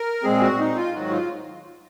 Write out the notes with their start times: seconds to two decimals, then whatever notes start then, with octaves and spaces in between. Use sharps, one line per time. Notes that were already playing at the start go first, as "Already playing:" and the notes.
Already playing: A#4
0.23 A#2 G#3 C4 G#4
0.41 F#4
0.59 D#4
0.76 F4
0.94 G#2 D#3 F#3 F#4
1.11 F4